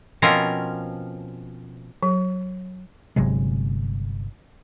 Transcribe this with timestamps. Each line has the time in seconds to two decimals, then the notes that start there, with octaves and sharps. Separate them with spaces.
0.22 B2 F3 C4 C#4 F4 A#4
2.03 F#3
3.16 G1 C3 F#3 G#3